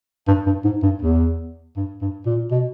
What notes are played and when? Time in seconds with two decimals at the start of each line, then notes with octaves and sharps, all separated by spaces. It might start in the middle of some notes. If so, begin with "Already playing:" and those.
0.28 G2
0.46 G2
0.65 G#2
0.83 G2
1.02 E2
1.77 G2
2.02 G2
2.26 A#2
2.51 B2